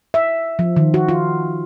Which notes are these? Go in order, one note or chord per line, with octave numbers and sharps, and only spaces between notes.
E5
F3
D#3
F#4
F4